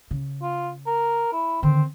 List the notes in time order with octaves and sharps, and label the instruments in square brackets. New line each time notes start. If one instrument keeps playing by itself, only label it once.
[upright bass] C#3
[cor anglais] F4
A#4
E4
[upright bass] D3 D#3 [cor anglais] C4